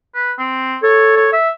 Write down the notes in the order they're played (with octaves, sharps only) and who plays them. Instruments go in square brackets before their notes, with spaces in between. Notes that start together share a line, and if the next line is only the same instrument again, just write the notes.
[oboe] B4
C4
[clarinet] A4 [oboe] C#5
[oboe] C#5
E5